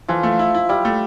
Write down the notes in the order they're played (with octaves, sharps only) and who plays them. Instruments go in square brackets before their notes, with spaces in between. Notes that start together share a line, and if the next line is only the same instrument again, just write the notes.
[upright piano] E3 [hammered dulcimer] F3
[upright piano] A3
E4
E4
[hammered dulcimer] G3 [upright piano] E4
[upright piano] A3